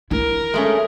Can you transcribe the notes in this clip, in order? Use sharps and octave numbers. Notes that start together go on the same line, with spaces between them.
E4 A#4
G#3 A3 C#4